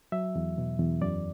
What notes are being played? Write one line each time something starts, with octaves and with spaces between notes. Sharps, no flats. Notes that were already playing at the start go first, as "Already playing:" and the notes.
F#3 E5
E2
B2
E2
F#2 D5